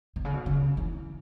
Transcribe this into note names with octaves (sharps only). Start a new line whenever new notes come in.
B2
C#3
B2
C#3
E3